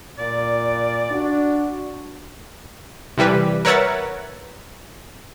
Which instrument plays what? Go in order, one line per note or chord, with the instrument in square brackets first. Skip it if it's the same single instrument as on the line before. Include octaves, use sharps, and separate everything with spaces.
[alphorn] A#2 [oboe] D5
[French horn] D4 [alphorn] F#4
[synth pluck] C3 E3 G3 B4
A#4 B4 C#5 E5 F#5 A6